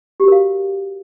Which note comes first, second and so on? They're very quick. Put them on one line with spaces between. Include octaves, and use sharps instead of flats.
G4 F#4 A#4 F5